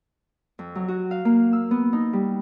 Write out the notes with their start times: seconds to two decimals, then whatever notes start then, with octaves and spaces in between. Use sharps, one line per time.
0.59 F2
0.75 F#3
0.88 F#4
1.11 F5
1.25 A#3
1.53 E6
1.71 B3
1.93 D#4
2.13 G3